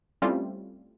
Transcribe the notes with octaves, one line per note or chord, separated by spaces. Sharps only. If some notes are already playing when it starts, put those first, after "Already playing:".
G3 A3 C4 C#4 E4 F4